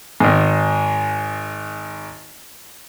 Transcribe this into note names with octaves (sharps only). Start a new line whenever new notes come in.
G#1 G#2